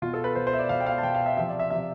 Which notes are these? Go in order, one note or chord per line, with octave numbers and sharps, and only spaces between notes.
B2 F4
A4
B4
B2 C5
C5
E5
D5
B2 F5
G5
F5
G5
A5
B2 G5
F5
E5
C3 F3 E5
D5
E5
C3 F3 E5